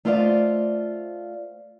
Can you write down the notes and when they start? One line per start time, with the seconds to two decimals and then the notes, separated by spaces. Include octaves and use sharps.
0.05 A3 F4 C5 D5 D#5 F5